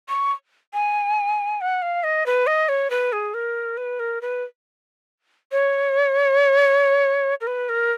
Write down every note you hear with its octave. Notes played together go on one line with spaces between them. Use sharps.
C#6
G#5
F#5
F5
D#5
B4
D#5
C#5
B4
G#4
A#4
B4
A#4
B4
C#5
A#4
B4
A#4